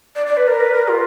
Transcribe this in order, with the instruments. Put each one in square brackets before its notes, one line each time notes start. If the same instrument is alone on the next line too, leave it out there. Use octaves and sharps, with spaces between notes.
[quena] D5
D5
B4
A#4
B4
A#4
F4